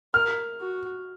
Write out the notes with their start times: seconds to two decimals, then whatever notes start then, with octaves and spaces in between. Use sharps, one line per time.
0.14 A#4 F6
0.60 F#4